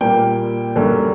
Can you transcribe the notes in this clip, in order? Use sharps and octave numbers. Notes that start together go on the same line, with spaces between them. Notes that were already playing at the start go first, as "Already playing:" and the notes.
A#2 G3 A#3 G5
F#2 D3 G3 A#3